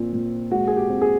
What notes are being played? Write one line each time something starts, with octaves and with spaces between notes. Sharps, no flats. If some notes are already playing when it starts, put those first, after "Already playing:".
Already playing: A#2 C4
A#2
G#3 F#4
G#4
G4
C4
G#4